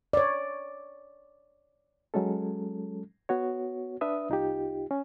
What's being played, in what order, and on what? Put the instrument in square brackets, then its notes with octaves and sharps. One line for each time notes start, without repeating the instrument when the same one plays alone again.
[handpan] C#5 D5
[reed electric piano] F#3 G#3 C#4 A4
B3 F#4 C#5
D4 B4 E5 D#6
C2 D#4 F4 G4
C#4